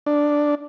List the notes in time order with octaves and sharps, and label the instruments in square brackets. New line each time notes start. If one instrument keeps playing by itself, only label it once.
[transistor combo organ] D4